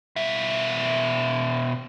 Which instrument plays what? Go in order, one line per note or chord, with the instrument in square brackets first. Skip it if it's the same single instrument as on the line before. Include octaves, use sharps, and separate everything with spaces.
[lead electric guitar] B2 E5